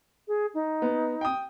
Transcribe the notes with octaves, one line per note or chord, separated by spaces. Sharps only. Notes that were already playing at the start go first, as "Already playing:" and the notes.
G#4
D#4
B3
G5 D#6